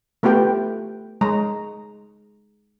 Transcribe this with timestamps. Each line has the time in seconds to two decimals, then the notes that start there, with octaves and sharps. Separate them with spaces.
0.23 A3 B3 F4 G4 B4 G5
1.21 G#3 A#5